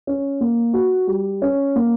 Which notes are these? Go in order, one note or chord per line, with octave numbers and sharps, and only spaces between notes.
C#4
A#3
F#4
G3
C#4
A#3